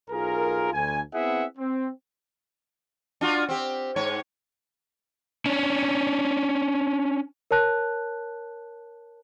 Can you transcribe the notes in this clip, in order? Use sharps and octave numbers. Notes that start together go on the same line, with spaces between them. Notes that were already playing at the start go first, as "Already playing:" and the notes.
B1 F4 G#4 A#4
D2 G#5
B3 C4 E4 G#4 E5 F#5
C4
D4 F4 F#4
C4 G4
G#2 C#5
C#4 D4
A#4 C#5 A5 F#6